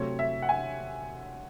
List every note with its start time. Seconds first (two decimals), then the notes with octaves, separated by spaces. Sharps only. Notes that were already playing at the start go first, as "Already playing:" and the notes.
Already playing: C3 F#3 A3 C4 C#5
0.19 E5
0.42 F#5
0.49 G#5